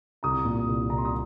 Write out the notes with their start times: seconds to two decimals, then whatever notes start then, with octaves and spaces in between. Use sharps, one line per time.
0.23 C2 A#5 D#6
0.45 A#2
0.68 C2
0.90 C2 A#5
0.98 C6
1.05 D#6